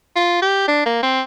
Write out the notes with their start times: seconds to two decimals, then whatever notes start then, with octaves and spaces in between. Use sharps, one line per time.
0.16 F4
0.42 G4
0.68 D4
0.86 A#3
1.03 C4